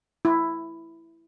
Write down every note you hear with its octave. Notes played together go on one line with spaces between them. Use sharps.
E4